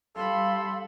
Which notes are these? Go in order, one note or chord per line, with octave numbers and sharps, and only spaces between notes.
G3 A4 F5 B5 C6